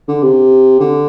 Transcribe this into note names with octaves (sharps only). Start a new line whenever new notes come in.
D3
C3
D3